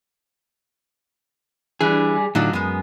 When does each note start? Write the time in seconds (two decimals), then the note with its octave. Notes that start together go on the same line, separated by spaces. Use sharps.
1.81 E3 G3 D4 G#4
2.35 A2 D3 F#3 D#4 F4
2.53 F#2 G#3 B3